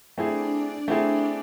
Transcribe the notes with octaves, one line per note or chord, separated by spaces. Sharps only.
A3 C4 D4 E4 G#4 D5
A3 C4 E4 G#4